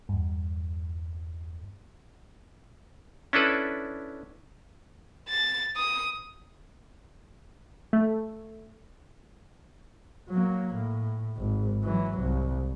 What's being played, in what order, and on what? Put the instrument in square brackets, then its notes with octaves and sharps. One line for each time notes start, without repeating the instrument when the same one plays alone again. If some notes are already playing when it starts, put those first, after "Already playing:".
[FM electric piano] E2 G2
[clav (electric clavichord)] C#4 D4 E4 A4 B4
[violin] A6
D#6
[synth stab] A3
[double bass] F#3 A#3
A2
G#1
E3 F#3
C2